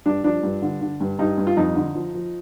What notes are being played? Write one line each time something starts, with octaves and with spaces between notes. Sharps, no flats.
G2 D4
F3 D4
G2
D3
D3
G2
G2 D#4
G2
F4
F2 D#4
D3
F3
F3